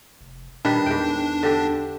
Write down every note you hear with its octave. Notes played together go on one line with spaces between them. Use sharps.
F1
A#2 D#3 G3 D4 B4
E2 G#2 G5
D3 G4